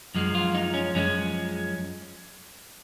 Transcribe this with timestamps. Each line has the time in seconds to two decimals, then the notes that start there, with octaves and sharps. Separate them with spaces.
0.15 F#2 F3 G#3
0.35 F4
0.55 D#4
0.74 C#4
0.94 F#2 F3 G#3 C#4